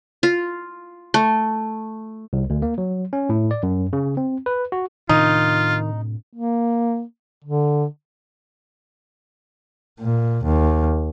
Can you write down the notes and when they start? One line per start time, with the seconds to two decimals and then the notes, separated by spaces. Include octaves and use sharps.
0.23 F4
1.14 A3
2.33 C2
2.50 D2
2.62 A#3
2.78 F#3
3.13 C#4
3.29 A2
3.51 D5
3.63 F#2
3.93 C#3
4.17 C4
4.46 B4
4.72 F#4
5.09 A2 C3 D#3 D4 D#4 F4
6.33 A#3
7.44 D3
10.00 A#2
10.44 D#2